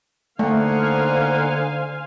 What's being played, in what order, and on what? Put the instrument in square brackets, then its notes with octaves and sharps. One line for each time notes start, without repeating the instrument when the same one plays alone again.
[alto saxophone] D3 [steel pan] A3 [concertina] A#3 D#4 F#5 [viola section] C5 F5 G#5